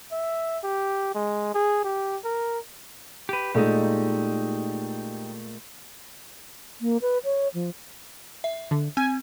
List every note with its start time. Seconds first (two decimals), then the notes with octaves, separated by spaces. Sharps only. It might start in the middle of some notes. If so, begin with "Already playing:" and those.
0.12 E5
0.63 G4
1.14 G#3
1.54 G#4
1.84 G4
2.24 A#4
3.29 G4 B4
3.55 A#2 G#3 A3 D#4 G4
6.81 A#3
7.02 B4
7.24 C#5
7.54 F3
8.44 E5
8.71 D3
8.97 C4 G#5